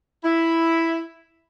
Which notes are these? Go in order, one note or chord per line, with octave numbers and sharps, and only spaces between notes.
E4